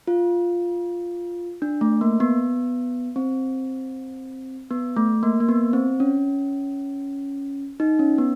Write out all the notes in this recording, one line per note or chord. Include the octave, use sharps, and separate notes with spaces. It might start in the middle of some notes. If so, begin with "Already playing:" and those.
F4
D4
A3
A#3
B3
C4
B3
A3
A#3
A#3
B3
C4
C#4
D#4
C#4
B3